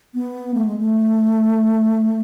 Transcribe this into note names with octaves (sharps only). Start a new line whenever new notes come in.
B3
A3
G#3
A3